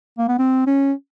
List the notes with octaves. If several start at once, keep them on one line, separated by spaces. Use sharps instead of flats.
A#3
B3
C4
C#4